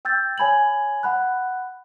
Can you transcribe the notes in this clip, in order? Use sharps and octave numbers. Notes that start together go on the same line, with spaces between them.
G5 E6 G6 A6
C#5 G#5 B5 G#6 F#7
F#5 B5 F#6